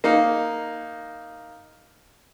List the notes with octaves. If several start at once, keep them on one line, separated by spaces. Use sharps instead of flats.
A#3 D#4